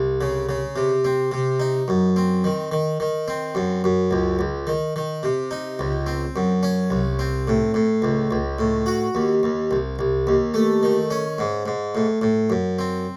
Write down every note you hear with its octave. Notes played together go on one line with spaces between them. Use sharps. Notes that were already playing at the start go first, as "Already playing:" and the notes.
Already playing: C2
C#3
C#3
C3
C4
C3
D#4
F#2
C4
D#3
D#3
D#3
C4
F#2
F#2
C#2
C#2
D#3
D#3
C3
D#4
C#2
C4
F#2
C#4
C2
C4
A2
A2
C#2
C#2
A2
F#4
D#2
D#2
C2
C2
D#2
A3
D#3
C#4
G#2
G#2
A2
A2
F#2
C4